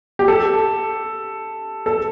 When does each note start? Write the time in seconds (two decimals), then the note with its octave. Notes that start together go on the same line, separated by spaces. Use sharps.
0.19 G4
0.28 A4
1.86 A4